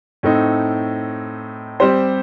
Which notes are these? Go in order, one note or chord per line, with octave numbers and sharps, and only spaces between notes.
A2 A3 C4 D#4
G3 C4 G4 C5